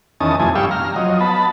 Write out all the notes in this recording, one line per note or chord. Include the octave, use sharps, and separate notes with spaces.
E2 D#3 C#4 A5 D#6
F2 C3 E3 A3 G#5
G2 G3 F5 G5 C#6 E6
A#5 F6
F3 F#3 D#5
B3 A5 B5